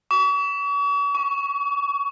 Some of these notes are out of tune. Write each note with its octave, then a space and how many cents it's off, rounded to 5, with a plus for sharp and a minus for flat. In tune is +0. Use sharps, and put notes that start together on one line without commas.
C#6 +45
C#6 +15